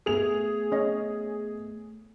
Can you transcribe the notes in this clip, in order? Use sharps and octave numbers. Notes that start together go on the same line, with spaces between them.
A3 B3 G#4 F7
C#4 D#5